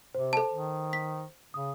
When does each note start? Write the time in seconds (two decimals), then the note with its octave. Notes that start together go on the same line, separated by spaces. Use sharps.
0.15 C3 C5
0.33 A4 A5
0.53 D#3
0.93 B6
1.54 C#3 D#6